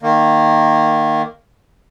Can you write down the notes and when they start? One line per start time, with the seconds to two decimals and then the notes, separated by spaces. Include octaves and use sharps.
0.02 D#3 A#3